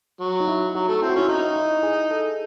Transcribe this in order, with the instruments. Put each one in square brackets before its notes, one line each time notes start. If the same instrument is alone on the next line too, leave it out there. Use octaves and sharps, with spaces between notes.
[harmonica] F#3
[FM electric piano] D#4
E4
[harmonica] F#3 [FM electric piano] F#4
[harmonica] A3
[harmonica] C4 [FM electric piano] E4
[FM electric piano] F#4
[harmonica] C#4 [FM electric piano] E4
[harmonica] D#4 [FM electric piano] E4
[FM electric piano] E4
G#4
A4